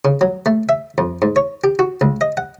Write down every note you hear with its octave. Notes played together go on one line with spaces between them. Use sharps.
C#3
F#3
A3
E5
F2
G#2
C#5
G4
F#4
C#2
D#5
F#5